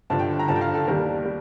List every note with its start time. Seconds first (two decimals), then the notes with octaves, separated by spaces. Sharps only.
0.10 G2 D3 F3 A5
0.19 G5
0.39 A#5
0.48 G2 D3 F3 A5
0.56 G5
0.61 F5
0.74 A4
0.88 D#2 D#3 G3 A#4
1.26 G3